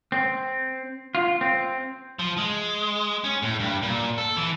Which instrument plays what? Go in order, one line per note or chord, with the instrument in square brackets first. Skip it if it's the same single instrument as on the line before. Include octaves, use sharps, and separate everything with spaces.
[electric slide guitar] C4
F4
C4
[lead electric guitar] F3
G#3
C#4
A2
G2
A#2
A4
E3